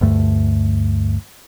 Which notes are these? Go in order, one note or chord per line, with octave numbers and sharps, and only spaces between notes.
D2 G2 A3